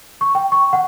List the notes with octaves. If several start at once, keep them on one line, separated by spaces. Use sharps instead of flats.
C#6
G5
C#6
F#5